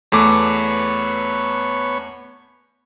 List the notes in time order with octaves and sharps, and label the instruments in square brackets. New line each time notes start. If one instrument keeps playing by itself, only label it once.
[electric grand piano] E2 A3 D6 [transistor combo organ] B3 C#5